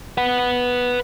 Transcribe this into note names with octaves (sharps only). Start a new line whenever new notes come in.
B4 F#5